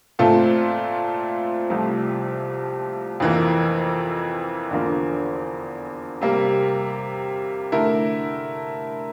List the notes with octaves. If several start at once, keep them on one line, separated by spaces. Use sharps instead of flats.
A#2 A3 C4 F4 A4
C2 C3 F3 A3
F2 E3 A#3
E2 D3 F3 A#3
C3 G3 A#3
D3 A3 E4 A#4